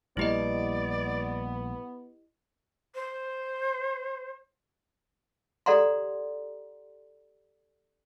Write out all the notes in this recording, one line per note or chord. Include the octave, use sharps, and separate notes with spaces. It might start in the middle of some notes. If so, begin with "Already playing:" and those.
A#1 G3 A#3 B3 E4 G4 D5 D#5
C5
G4 A4 D5 F#5 A#5 C6